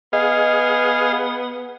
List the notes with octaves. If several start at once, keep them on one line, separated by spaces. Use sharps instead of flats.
B3 G#4 D#5 F5